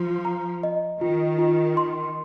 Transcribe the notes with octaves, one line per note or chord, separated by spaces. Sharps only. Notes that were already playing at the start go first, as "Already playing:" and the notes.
Already playing: F3 F4
A#5
D#5
D#3 F4
F4
C6